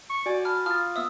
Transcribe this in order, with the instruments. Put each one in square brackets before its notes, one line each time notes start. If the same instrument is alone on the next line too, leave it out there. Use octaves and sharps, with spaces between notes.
[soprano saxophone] C#6
[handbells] F#4 G#5 G#6 [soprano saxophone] D5
[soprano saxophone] A5 [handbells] B5 [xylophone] F6
[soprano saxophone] F4 [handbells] D#6 A6 [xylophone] F6
[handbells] B3 E5 [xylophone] D#6 E6